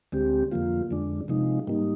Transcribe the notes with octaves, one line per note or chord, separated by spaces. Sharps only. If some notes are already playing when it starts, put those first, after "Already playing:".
D2 D3 G#3 C4 G4
F2 D3 F3 A#3 F4
F2 D3 G#3 D4
C3 F3 G#3 D#4
G#2 G3 A#3 D#4